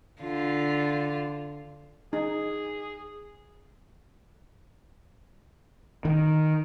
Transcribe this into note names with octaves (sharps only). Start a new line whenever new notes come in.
D3 F4
D#4 G#4
D#3